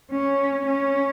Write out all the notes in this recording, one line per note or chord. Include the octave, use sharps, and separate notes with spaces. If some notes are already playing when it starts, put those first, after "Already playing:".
C#4
C#4